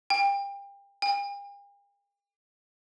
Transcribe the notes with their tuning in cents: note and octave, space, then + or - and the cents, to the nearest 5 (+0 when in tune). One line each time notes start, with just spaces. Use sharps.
G5 +30
G5 +45